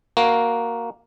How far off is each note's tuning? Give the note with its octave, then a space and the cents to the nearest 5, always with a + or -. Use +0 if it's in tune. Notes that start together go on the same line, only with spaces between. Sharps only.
A#3 +0 F#4 +0